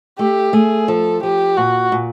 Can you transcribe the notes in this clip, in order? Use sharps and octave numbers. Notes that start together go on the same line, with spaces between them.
A3 G4
A3 G#4
F3 A4
F3 G4
A#2 F#4
A#2